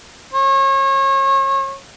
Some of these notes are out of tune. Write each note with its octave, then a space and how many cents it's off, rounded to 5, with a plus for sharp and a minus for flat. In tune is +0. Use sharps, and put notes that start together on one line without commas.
C#5 -35